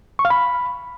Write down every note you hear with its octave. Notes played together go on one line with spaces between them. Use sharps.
C#6
F5
B5